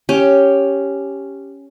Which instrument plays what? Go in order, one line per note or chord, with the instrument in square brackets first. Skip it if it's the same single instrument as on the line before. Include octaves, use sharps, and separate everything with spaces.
[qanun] C#4 G4